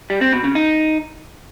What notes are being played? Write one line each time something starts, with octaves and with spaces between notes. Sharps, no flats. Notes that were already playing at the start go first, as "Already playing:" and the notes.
G3
C4
B2
C#3
D#4